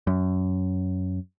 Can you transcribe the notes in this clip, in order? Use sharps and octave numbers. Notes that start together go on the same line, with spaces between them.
F#2